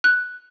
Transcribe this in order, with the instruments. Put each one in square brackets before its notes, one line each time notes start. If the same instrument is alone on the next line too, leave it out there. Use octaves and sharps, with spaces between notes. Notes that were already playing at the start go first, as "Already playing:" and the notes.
[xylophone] F#6